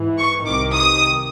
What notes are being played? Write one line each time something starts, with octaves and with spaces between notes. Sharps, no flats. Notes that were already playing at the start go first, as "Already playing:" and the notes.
Already playing: G#2 E3
C#6
C2 C3 D#3 D6
D#6